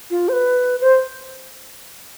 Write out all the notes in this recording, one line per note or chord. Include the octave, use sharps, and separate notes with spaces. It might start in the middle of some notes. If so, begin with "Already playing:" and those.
F4
C5
B4
C5